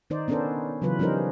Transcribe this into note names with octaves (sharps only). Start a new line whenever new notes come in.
D#3 D#4 C5 D5
B3 C#4 D4 A4 A#4 C5
C#3 E3 F#3 F4 B4
F3 G3 C#4 D#4 A#4 C5